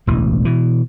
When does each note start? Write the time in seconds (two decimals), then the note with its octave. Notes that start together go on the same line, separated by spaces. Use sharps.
0.07 E1 A1 D2 E3
0.45 B2 E3